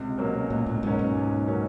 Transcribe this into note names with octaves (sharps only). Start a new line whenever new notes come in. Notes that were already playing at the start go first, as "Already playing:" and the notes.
Already playing: C#2 C3
B2 F#3 A#3 C#4
C#2 A#2
A2
G#2 B2 F#3 A#3 C#4
G#2
C#2
B2 F#3 A#3 C#4